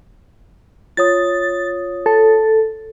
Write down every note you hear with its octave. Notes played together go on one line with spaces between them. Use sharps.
F4 C#5 D#6 A6
A4